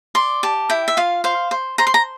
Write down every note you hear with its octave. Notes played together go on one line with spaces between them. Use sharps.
D5 C6
G4 A5
E4 G5
E5
F4 F5
C5 F5
C5
C5 A#5
C6
A#5